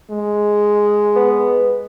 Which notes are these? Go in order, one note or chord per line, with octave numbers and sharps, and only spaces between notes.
G#3
B3